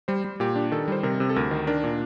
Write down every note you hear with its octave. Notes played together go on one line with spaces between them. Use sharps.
G3 C5
G3
A#2 G4
D4
D#3 A4
G3 C5
C3 A#4
C3
A4
D2 A#4
D#3
D4 A#4
A#2